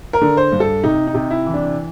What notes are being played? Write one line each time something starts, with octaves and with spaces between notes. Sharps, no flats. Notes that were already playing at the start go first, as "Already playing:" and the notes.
A#4
D3
C5
G2
A4
C3 D#4
D#4
C3
E4
E3
D4